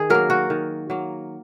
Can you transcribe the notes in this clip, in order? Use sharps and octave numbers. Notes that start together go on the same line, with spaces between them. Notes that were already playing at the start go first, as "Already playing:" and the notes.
Already playing: D#3 G#4
F#3 A#3 A#4
F#4
D#3
F#3 A#3